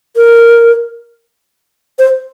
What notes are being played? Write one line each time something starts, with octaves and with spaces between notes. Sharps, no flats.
A#4
C5